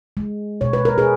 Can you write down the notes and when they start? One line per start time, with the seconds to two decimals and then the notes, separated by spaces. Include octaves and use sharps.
0.17 G#3
0.61 B2 C#5
0.73 B4
0.85 A#4
0.98 G#4 B4